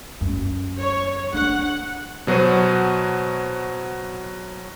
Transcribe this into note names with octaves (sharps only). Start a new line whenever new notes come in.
F#2
C#5
D4 F#5
B2 F#3 F#4 C5 D#7